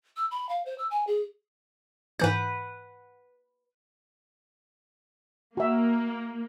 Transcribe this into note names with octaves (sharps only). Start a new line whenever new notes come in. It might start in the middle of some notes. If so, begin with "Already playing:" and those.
E6
B5
F5
C5
E6
G#5
G#4
G#2 E3 B4 F#5 G6
A#3 F#4 E5